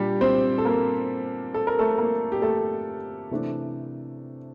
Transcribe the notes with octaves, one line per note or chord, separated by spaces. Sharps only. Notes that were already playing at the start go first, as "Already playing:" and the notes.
Already playing: A#2 G3 D4 G4
C4 C5
A4
A#3 A#4
A4
A#4
A3 A4
A#3 A#4
G4
A3 A4
C3 E3 A3 D4